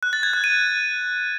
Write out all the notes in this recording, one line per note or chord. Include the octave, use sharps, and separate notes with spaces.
F#6
A6
G#6
F#6
D#7